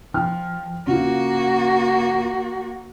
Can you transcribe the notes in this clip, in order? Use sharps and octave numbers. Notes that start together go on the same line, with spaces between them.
F3 G5 F6
C#3 A#3 F4 F#4